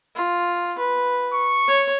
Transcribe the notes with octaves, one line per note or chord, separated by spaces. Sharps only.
F4
B4
C#6
C#5